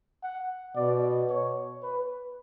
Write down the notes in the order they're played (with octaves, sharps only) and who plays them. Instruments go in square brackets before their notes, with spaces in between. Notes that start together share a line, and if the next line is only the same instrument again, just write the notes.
[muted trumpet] F#5
[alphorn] B2 [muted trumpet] D5
[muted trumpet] C#5
B4